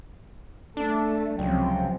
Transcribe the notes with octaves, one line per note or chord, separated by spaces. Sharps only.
A3 D4 A4
C#2 C3 F3 F#3 G5